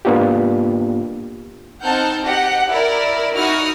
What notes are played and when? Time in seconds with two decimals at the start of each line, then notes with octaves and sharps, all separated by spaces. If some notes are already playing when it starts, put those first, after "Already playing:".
0.05 G#2 A#3 B3 D4 F4 G4
1.84 C4 D#4 F#5 A5 F6 G6
2.24 G4 D#5 F#5
2.71 E4 A#4 D5
3.37 D#4 E4 F#4 D#6 F6